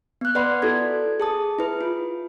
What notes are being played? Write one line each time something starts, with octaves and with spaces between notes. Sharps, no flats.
B3 F#6
B4 D5 F#5 B5 C6
E4 F#4 A4 G#6
G#4 A5 D#6
E4 B4
F4